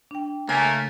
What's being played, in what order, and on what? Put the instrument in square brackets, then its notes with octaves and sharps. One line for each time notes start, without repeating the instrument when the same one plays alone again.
[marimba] D4 G5
[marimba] C#3 A6 [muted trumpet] A3 [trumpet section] A#3 [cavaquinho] G#5